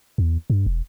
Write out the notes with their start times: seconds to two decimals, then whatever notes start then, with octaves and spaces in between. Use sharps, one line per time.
0.18 E2
0.50 G2
0.66 E1